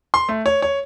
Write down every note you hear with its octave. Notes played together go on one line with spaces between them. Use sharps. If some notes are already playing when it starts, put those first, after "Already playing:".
C6
A3
C#5
C#5